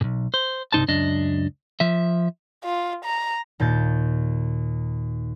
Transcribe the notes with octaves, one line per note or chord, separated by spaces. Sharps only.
B1 G#2
C5
C2 G2 D#3 D#4 C5 A5
C#2 F#2 D4 D#5
F3 E5
F4
A#5
D#2 A#2 G6 A6